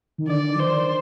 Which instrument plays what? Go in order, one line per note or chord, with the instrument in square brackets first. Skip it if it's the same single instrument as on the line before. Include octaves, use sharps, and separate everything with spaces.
[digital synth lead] D#3
[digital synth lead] D3 [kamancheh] D5
[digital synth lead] F3
[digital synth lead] D#3 [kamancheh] C5